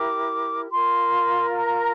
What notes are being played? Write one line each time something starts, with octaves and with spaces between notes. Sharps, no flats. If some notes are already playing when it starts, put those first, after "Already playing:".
Already playing: E4 G4 A#4 D6
F4 A#4 C6
A#5